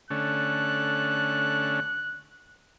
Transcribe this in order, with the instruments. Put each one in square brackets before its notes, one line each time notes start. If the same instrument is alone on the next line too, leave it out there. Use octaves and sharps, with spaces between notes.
[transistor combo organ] D3 A3 C#4 [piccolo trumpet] F#6